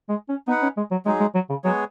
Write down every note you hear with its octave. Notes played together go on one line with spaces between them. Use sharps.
G#3
C#4
B3 D#4 B4 F#5
C#4
G#3
F#3
F#3 G#3 D#4 G#4
G#3
F#3
C#3
F#3 G#3 B3 G#4 C#5